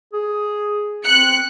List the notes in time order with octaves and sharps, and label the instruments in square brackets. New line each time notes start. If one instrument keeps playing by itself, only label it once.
[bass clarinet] G#4
[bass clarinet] C4 [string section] F#6 C#7